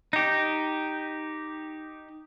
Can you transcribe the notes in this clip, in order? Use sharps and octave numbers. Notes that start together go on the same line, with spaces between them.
D#4 G4